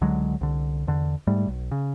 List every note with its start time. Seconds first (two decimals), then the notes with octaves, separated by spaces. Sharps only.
0.01 C#2 D3 F#3 G#3
0.41 C2 D3
0.87 E2 D3
1.27 G#2 G3 A3
1.48 B1
1.71 C#3